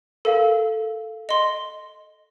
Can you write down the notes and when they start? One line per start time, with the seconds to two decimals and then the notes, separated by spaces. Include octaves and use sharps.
0.25 A4 A#4 F5 F#5
1.29 D#5 C6